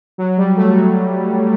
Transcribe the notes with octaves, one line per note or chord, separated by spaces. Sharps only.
F#3
G3
A3
F#3